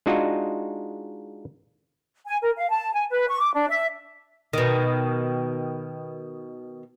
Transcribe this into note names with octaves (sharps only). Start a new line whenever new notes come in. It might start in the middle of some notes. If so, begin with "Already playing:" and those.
G#3 D4 D#4 F4 F#4
G#5
A#4
F5
A5
G#5
B4
C#6
D6
D4
E5
B2 D#3